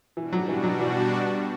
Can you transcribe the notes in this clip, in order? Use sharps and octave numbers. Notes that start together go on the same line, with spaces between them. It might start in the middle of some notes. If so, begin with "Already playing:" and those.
B2 E3 G3 D4 F#4
F#3
E3
F#3
E3